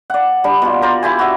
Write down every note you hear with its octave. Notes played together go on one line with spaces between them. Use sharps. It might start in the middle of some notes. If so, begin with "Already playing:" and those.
D5 F#5
G3 D4
B2 F4
A#4 C5 D5
E4 G4 G#5
F#4 E5